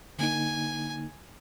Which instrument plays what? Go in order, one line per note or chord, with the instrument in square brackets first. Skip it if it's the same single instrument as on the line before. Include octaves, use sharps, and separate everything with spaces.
[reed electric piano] D3 A#3 D#4 [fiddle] G#5